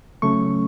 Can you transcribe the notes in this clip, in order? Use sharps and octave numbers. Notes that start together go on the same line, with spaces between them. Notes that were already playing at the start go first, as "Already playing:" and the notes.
C#3 F#3 A3 C#4 C#6